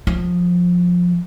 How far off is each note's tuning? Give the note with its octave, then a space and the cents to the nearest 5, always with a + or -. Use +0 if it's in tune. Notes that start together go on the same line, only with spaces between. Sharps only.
F3 +20